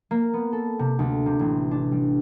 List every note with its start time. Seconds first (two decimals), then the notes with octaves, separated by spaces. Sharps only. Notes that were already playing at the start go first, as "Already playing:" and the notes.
0.11 A#3
0.34 B3
0.53 A4
0.79 C3
0.99 D2
1.26 C3
1.39 A1
1.71 D4
1.92 G3